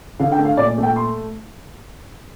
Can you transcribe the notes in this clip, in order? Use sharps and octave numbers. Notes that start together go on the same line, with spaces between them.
D3 F5
G5
A3
F5
A#2 D5
A3
G5
C6